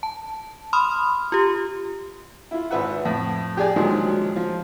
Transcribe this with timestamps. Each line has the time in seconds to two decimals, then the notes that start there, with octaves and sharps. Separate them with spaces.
0.03 A5
0.73 B5 C6 D#6 F6
1.32 F4 G4
2.51 E4 F4
2.71 G#1 B4 E5 F#5
3.05 F2 A2
3.57 G4 G#4 D5 G#5
3.76 D2 A#2 D#3 F3 F#3 G#3
4.36 F3